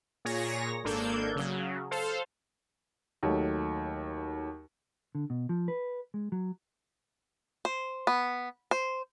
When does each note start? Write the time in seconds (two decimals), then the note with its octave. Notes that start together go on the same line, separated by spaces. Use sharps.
0.25 A#2 G#4 C#5 A#6
0.84 G#1 A#3 D4 A4 G6 G#6
1.36 C#3 F#3
1.91 A4 C5 F5
3.23 D#2 F#3 A3
5.15 D3
5.30 B2
5.49 F3
5.68 B4
6.14 G#3
6.32 F#3
7.65 C5
8.07 B3
8.71 C5